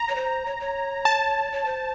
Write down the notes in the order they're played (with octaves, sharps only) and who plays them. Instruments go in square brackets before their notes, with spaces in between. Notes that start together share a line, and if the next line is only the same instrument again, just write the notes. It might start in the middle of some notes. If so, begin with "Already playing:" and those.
Already playing: [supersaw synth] A#5
[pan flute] C#5
C5
C#5
C#5
[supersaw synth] A5
[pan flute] C#5
C5